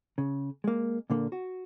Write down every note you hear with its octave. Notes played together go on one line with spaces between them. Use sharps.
C#3
G#3 A#3
A#2 D3 A#3
F#4